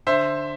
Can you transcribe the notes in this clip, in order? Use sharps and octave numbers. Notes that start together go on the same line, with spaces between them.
D3 C5 E5